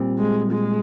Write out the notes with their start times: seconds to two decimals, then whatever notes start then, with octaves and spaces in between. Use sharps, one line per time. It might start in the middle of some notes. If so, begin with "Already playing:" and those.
Already playing: A#2 G3 C4
0.18 G#3
0.51 G#3